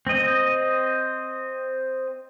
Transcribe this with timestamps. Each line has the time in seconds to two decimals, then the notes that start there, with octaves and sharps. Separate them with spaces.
0.07 C4 D#5